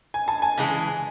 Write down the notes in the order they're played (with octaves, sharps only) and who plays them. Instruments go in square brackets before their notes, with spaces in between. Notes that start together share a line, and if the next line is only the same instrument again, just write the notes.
[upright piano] G#5
A5
G#5
[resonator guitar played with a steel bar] C#3 E3 G#3